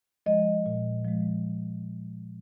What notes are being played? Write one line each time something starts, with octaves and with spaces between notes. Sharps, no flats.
F3 G#3 D#5
A#2
F3 G#3